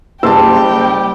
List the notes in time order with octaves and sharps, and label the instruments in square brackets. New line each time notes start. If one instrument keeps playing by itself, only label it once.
[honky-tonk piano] F#1 [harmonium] G3 G4 [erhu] G5 [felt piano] A5 C6 E6